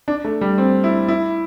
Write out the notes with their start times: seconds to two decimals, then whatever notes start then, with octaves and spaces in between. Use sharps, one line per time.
0.08 D4
0.25 A3
0.41 G3
0.58 C4
0.84 E4
1.08 E4